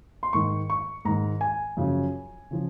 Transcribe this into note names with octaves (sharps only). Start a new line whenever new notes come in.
C6
G#2 D#3 C#6
C#6
G#2 D#3 A#5
G#5
F#2 C#3 F3
C#3 F3